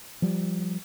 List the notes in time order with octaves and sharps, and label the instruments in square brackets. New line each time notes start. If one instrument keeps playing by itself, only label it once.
[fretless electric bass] F3 G3